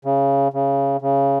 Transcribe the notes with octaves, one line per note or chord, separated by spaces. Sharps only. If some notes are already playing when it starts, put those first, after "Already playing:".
C#3
C#3
C#3